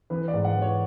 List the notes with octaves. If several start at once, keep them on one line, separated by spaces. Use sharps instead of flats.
E3 B4
D5
G#2
F#5
E3
C#5